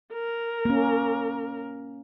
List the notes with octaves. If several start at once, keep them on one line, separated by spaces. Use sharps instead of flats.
A#4
A#3 C#4